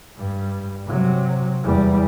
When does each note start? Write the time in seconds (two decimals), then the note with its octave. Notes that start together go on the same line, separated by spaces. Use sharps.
0.17 G2 G3
0.86 C3 F#3
1.63 E2 G3